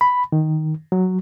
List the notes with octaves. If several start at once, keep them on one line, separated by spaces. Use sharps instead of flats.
B5
D#3
F#3